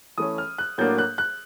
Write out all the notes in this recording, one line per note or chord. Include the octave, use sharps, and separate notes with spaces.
E3 A3 C#4 D#6
F6
F#6
A2 F#3 A#3 D4 G6
F#6
F#6